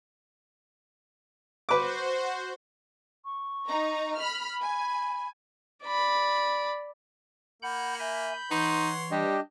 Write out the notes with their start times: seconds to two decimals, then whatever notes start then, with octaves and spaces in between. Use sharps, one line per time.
1.69 F#4 B4 C5 D6
3.25 C#6
3.66 D#4 A#5
4.16 B5 F6
4.59 G#5 B5
5.84 D5 B5
7.62 A#3 F#5 B5 G6
8.00 E5 G#5 B5 G6
8.51 E3 D#4 C#5 F#5 C6
9.11 G3 D4 G4 D#5